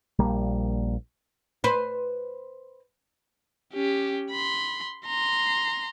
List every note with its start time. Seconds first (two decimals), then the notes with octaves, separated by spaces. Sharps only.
0.19 A#1 G3 A#3
1.64 B4 C5
3.74 C#4 G4
4.31 B5 C6
5.06 A#5 C6